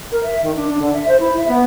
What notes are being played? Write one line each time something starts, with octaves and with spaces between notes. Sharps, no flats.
A#4
E5
D#3
D4
D4
D3
E5
C5
E4
E5
B3